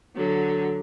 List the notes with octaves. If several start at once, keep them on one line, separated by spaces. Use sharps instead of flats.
D3 F#3